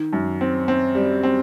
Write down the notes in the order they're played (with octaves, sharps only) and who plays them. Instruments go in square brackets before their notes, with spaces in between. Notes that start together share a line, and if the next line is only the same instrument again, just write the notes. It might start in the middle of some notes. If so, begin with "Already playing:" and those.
Already playing: [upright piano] D#3
F#2
C4
C4
G3
C4